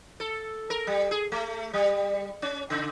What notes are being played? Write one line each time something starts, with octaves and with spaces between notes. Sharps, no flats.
A4
A#4
G3
G#4
A3
G3
C#4
C#3